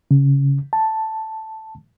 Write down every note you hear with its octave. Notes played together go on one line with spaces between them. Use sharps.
C#3
A5